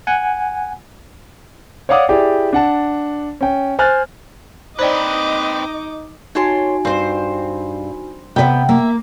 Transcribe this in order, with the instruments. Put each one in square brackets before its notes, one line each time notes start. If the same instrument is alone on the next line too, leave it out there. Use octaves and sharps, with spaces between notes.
[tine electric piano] F#5 G#5
[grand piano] C#5 D5 F5 F#5 D6 D#6
E4 G4 G#4 D5
D4 F#5 A5
C#4 G5
C5 G#5 F6 F#6 A6
[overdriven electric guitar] C4 B4 [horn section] D#4 [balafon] C5 D5 G5 [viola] D#5 D6
[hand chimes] D#4 F#4 G#5 [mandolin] C#5 A5 C6
[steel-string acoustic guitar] G2 [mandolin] C4 C5
[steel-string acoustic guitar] C3 D5 F#5 [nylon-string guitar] B3 B4 E5 [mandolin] G5
[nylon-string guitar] A#3 [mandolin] E5